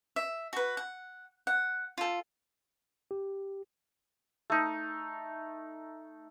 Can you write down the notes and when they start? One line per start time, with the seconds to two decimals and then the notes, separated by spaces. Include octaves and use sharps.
0.16 E5
0.53 F#4 B4
0.77 F#5
1.47 F#5
1.98 F4 A4
3.11 G4
4.50 A3 D#4